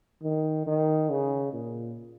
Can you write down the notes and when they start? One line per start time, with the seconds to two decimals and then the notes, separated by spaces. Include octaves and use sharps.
0.23 D#3
0.67 D#3
1.09 C#3
1.53 A#2